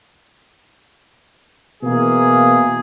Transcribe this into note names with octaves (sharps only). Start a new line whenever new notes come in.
B2 E3 A#3 G#4